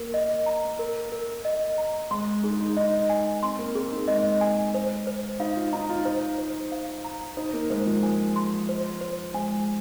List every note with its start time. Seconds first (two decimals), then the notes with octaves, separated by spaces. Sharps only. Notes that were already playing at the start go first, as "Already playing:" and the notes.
Already playing: A#3 A#4
0.14 D#5
0.46 A#5
0.79 A#4
1.12 A#4
1.45 D#5
1.78 A#5
2.11 G#3 C6
2.44 D#4 G#4
2.60 D#4
2.76 D#4 D#5
3.10 G#5
3.43 C4 C6
3.59 A#3
3.75 C4 G#4
3.92 D#4
4.08 G#3 D#5
4.41 G#5
4.74 C5
5.07 C5
5.40 D#4 F5
5.56 F4
5.73 D#4 A#5
5.89 F4
6.05 D#4 C5
6.38 C5
6.72 F5
7.04 A#5
7.37 D#4 C5
7.53 A#3
7.70 G#3 C5
7.86 F3
8.02 F3 G#5
8.36 C6
8.69 C5
9.01 C5
9.34 G#3 G#5